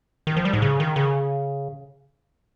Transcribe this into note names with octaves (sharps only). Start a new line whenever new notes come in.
D#3
F3
G3
G#2
C#3
D#3
C#3